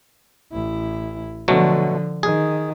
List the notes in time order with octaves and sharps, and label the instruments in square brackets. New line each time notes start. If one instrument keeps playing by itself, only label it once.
[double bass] A1 E4
[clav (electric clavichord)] B2 F#3 A3 [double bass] D3 F3
[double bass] D#3 [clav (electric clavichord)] G#4